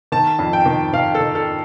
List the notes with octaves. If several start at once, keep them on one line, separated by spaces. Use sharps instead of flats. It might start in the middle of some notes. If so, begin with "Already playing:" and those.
D#3 A5
F2
G5
D#3
D#3 F5
A4
D#3
A4